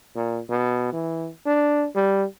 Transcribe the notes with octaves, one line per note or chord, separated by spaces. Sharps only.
A#2
B2
E3
D4
G3